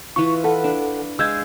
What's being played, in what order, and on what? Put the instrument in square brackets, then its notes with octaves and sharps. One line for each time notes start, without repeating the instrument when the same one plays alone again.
[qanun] E3 F4 [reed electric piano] C#6
[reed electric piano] A4 F#5 [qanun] B4
[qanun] D4
[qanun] G#3 E5 F5 [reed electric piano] E6 G6 G#6